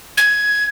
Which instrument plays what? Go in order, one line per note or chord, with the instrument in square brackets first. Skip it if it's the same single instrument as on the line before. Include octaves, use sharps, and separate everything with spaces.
[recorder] G#6